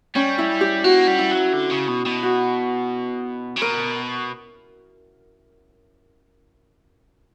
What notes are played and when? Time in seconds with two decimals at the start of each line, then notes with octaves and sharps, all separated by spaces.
0.15 G3 C#4
0.38 E4
0.61 G4
0.84 A#3 F#4
1.08 G3
1.19 E4
1.31 F#3
1.53 D3
1.71 C#3
1.88 B2
2.06 B2
2.23 F#4
3.56 C#3
3.62 B2 A#4